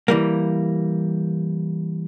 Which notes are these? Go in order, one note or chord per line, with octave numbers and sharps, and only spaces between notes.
E3 G3 A#3